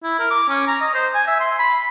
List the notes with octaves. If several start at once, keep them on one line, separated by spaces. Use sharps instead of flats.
E4
A#4
D6
C#4
A#5
D#5
C5
G#5
E5
C6
B5